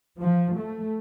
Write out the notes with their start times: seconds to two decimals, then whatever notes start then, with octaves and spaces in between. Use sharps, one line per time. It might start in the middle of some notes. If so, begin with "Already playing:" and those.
0.18 F3
0.59 A3